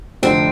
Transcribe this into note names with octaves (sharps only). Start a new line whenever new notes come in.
F1 F2 D3 F3 C4